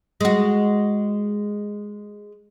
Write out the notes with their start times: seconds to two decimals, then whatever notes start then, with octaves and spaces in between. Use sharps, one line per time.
0.21 G#3 F#4